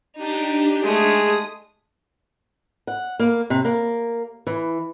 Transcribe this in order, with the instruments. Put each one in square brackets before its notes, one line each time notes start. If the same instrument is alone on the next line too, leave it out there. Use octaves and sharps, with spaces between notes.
[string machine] D4 G4 [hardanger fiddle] D#4
[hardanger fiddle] G#3 A3 [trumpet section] G#4 [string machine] D#6
[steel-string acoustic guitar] F#5
A#3
C3
A#3
E3